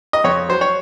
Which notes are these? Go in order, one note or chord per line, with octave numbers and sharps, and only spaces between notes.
D#5
F2 C#5
F#3 C5
C#5